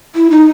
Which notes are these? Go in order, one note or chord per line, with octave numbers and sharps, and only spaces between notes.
E4
D#4